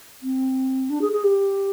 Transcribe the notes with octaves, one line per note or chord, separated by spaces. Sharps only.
C4
D4
G#4
G#4
G4